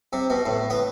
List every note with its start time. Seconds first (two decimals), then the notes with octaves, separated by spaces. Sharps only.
0.13 C3
0.30 B2
0.46 A2
0.70 B3